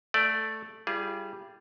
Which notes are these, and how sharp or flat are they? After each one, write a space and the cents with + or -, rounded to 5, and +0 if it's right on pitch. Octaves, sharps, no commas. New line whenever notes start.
A3 +0 D5 +0
G3 +0 F4 -45 G#4 +0